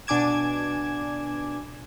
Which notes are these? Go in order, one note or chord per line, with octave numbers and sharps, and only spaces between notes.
B2 D4 G#5 D6 G#6 E7